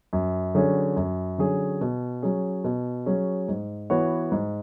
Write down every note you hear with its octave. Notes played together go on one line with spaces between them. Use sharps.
F#2
D3 F#3 C#4 G#4
F#2
D3 F#3 C#4 G#4
B2
F#3 C#4 G#4
B2
F#3 C#4 G#4
G#2
E3 B3 F#4 C#5
G#2